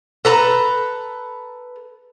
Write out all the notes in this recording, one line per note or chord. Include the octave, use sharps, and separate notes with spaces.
A4 B4 A#5